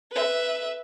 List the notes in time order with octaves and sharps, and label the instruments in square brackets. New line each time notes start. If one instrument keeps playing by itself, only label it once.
[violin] B4 E5